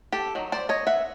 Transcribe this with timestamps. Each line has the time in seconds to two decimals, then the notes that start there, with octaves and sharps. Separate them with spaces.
0.12 G4 A4
0.35 D#3 F#3
0.52 C5 D5
0.69 C#5 D#5
0.87 E5 F#5